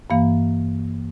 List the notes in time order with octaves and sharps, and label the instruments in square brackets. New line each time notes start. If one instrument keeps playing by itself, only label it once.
[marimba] G2 E3 A#3 F5